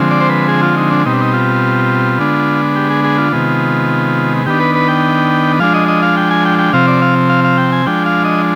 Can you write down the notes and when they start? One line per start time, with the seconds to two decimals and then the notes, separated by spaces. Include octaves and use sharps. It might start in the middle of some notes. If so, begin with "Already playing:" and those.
Already playing: D3 F3 G#3 C4
0.11 D5
0.21 C5
0.30 B4
0.48 G#4
0.63 F4
0.77 D#4
0.91 D4
1.06 B2 G3 C4 D#4
1.13 D4
1.21 D#4
1.33 F4
2.19 D3 G#3 B3 D4
2.76 G4
2.91 G#4
3.04 G#4
3.18 F4
3.32 C3 D#3 G#3 B3
4.46 D#3 B3 D4 G4
4.60 B4
4.75 B4
4.88 G5
5.59 F3 G#3 D4 F5
5.74 D#5
5.88 D#5
6.03 F5
6.17 G5
6.31 G#5
6.45 G5
6.59 G5
6.73 C3 F3 C4 F5
6.88 D5
7.02 F5
7.29 F5
7.45 F5
7.58 G5
7.72 G#5
7.86 F3 G#3 D4 G5
8.06 F5
8.25 D#5